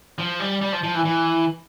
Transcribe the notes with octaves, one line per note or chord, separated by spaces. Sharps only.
F3
G3
G3
F3
F3
E3
E3